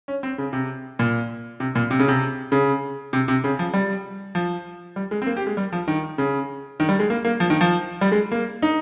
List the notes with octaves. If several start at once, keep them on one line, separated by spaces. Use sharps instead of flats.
C#4
C4
C#3
C3
A#2
C3
A#2
C3
C#3
C3
C#3
C3
C3
C#3
F3
G3
F3
G3
G#3
C4
A#3
G4
G#3
G3
F3
D#3
C#3
D#3
G3
G#3
A#3
A#3
F3
D#3
F3
G3
G#3
A#3
D#4